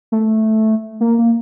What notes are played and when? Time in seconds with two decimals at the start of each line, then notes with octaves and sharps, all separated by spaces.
0.12 A3
1.01 A#3
1.19 A#3